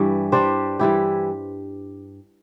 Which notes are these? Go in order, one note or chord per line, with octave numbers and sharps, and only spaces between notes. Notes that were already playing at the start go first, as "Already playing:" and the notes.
Already playing: G2 E3 G3 D4
G3 D4 G4 C5
E3 G3 E4 G4